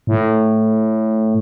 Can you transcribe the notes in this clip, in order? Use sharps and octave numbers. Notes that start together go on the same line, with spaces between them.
A2